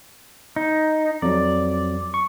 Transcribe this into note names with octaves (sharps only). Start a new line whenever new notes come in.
D#4
F2 F#3 D5
C#6